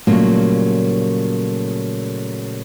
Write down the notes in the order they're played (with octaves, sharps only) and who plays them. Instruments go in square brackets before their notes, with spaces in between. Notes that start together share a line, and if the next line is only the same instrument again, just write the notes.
[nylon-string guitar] A#2 C#3 F#3 G3 A3 A#3